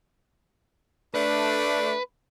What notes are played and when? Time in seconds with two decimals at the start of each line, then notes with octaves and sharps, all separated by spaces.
1.15 A3 D4 B4